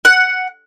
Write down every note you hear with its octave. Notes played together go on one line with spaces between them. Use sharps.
F#5